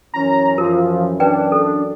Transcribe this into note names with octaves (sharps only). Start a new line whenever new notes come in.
F#2 E3 C#4 A#5
F#2 E3 F3 A#4
D4 B4 D5 G5
A4